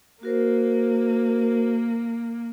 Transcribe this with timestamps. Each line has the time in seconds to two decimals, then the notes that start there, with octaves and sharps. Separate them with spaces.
0.23 A#3 F#4 A#4 C5